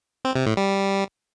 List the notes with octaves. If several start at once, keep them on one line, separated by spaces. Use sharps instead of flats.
C4
C3
A2
G3